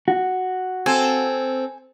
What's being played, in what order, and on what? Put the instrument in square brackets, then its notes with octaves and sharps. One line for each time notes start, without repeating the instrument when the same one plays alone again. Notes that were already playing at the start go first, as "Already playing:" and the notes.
[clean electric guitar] F#4
[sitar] C4 A4 [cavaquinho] G#5